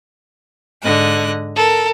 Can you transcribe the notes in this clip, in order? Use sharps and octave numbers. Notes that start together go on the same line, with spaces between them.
G#2 D3 D#5 F#6
A4 A#4